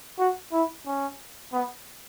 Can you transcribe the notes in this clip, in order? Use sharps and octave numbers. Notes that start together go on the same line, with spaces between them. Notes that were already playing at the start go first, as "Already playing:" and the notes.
F#4
E4
C#4
B3